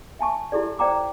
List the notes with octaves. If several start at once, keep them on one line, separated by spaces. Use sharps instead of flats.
E5 G#5 A5 C#6
E4 G4 A4 D5
C5 D5 G5 A#5 D6